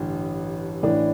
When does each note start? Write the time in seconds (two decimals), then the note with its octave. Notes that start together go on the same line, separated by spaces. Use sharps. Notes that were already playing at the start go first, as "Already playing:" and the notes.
Already playing: A1 G2 D3
0.83 A1 A2 E3 D4